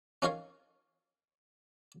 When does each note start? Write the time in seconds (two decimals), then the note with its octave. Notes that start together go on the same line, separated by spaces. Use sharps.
0.22 C#4 D#4 F4 A#4 C#5 F5